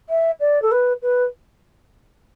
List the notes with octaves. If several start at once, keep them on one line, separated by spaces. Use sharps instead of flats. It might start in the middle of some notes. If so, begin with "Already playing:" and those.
E5
D5
A4
B4
B4